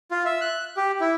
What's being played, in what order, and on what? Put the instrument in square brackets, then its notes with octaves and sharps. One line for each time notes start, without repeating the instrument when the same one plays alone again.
[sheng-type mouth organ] F4
E5
F#6
G4
E4